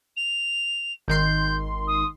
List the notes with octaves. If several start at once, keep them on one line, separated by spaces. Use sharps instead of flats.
F7
G#1 D#3 C6 G6
D#6